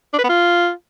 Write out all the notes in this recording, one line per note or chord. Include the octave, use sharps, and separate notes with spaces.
D4
B4
B3
F4